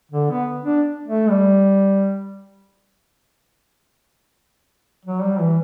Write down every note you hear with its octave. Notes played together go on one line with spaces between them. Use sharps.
D3
B3
D4
A3
G3
F#3
G3
E3